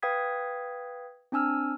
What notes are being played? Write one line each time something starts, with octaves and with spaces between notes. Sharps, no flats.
B4 F5 G5 D#6 G#6 B6
C4 D4 G#5 E6 F6